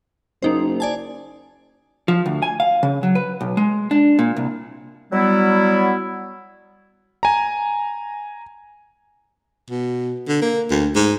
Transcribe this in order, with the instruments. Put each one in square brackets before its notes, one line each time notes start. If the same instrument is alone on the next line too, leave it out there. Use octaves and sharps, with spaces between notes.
[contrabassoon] F#1 [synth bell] A#3 D#4 C5
[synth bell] D5 G#5 A5
[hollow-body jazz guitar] F3
D2
G#5
F5
C#3
F#3
B4
B1
G#3
D4
A#2
C2
[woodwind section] F#3 G3 B3 E4
[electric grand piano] G#5 A#5
[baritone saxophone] B2
D3
A#3
D2
G#2